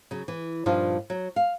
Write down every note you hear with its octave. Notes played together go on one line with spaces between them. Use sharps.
C#3 F#3
E3
G2 A#2 F3 D4 D#4 F4
F#3
F5